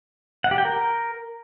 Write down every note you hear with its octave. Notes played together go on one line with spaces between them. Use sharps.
F#5
G4
G5
A#4